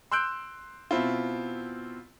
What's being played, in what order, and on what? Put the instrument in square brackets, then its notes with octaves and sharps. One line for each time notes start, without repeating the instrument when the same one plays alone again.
[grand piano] C6 E6 F#6 G6 D7
B2 C4 E4 F4